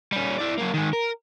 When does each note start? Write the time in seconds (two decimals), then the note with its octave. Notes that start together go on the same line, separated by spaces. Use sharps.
0.12 G3 C#4
0.38 E4 D5
0.58 F#3 A#3
0.73 D#3 G#3
0.93 A#4